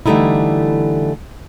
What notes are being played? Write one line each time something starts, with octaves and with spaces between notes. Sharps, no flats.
D3 E3 G3 A3 D#4 E4